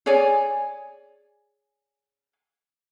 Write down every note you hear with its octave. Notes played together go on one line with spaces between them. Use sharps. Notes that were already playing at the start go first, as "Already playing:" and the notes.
G#4 C#5 D5 G#5